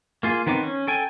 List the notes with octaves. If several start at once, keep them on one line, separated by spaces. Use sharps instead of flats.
A#3 F4 G#4
D#3 B3 C4 D#4 D6
C#4
A4 G5 G#5